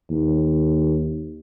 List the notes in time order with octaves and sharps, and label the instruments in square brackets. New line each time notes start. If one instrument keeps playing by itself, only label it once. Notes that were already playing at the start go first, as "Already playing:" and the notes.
[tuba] D#2